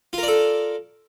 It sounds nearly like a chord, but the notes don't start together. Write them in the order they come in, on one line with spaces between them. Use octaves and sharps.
F4 A#4 D5 A4